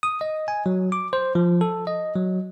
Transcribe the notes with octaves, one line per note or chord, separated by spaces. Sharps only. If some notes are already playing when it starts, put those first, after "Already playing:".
D#6
D#5
G#5
F#3
D6
C5
F3
A4
D#5
F#3